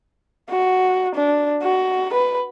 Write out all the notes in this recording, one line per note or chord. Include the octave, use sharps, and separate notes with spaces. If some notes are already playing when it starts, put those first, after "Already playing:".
F#4
D4
F#4
B4